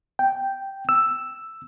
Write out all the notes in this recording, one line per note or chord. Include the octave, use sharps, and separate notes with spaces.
G5
E6